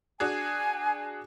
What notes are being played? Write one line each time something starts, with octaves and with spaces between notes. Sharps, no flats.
D4 F#4 G#4 G#5